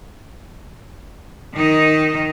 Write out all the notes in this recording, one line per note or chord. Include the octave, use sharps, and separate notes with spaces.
D#3 D#4